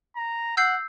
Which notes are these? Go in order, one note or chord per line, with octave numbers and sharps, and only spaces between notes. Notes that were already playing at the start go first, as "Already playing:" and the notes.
A#5
F#5 E6 G6 C7